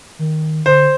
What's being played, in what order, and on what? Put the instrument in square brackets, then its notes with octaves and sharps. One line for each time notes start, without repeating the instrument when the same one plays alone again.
[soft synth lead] D#3
[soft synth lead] D3 [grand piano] C5